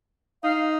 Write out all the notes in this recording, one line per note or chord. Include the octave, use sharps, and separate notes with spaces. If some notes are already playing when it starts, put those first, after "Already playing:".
D#4 F5